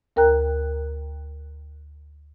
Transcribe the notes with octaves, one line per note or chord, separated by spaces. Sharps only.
D2 A#4 G5 A#5 F#6